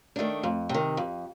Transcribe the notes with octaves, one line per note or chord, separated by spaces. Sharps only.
D#3 A3 D4
F2
C3 D#3
F2